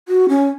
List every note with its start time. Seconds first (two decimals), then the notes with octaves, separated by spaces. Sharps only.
0.08 F#4
0.29 C#4